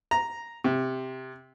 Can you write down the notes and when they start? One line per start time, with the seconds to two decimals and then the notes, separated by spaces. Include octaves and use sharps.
0.11 A#5
0.64 C3